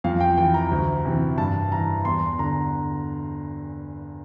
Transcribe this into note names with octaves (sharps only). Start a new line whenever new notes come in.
F2 F5
G5
E3 G5
A#5
D2
C3 E3
G2 A5
E3 A#5
E2 C6
D3 A#5